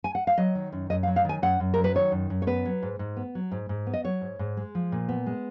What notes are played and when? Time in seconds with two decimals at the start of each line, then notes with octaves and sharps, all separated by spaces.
0.04 G#5
0.15 F#5
0.27 F5
0.38 F#3 D#5
0.55 D#3
0.72 F#2
0.90 F#2 D#5
1.03 F5
1.07 F#3
1.16 F5
1.25 D#3 G#5
1.42 F#2 F#5
1.60 F#2
1.74 F#3 A#4
1.84 B4
1.95 D#3 C#5
2.12 F#2
2.30 F#2
2.42 C#5
2.47 B3 B4
2.65 F#3
2.82 G#2
2.99 G#2
3.17 B3
3.35 F#3
3.52 G#2
3.69 G#2
3.87 B3
3.93 D#5
4.04 F#3 C#5
4.21 G#2
4.39 G#2
4.57 G#3
4.75 F3
4.92 A#2
5.09 B3
5.26 G#3